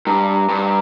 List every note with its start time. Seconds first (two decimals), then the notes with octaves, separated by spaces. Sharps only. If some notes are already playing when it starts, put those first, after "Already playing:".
0.07 G2 A#5
0.34 A#5
0.49 G2
0.63 A#5